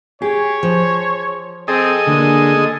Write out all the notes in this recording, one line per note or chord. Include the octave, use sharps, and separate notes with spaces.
G4 G#4 C#5
F3
C4 G#4 A4 D#5
D3 G#3 A#3 D4